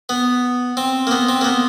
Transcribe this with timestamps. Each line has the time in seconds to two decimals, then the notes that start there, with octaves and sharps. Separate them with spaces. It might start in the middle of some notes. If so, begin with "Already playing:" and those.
0.09 B3
0.77 C4
1.07 A#3
1.11 B3
1.29 C4
1.41 A#3
1.45 B3